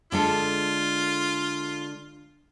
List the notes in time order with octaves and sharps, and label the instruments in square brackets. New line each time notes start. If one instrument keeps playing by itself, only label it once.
[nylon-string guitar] D3 G#3 A4 [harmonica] F4